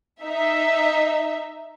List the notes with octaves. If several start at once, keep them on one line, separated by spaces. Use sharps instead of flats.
D#4 E5